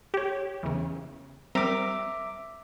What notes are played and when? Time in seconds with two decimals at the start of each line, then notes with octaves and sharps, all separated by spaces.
0.14 G4 C#5
0.63 E2 C#3
1.55 G3 C4 A#4 E5 D6